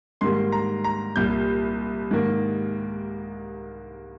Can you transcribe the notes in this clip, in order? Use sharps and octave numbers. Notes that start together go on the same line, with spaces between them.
G#2 D#3 G3 A#3 C6
A#5
A#5
C2 A#2 G3 G6
G#2 D#3 A#3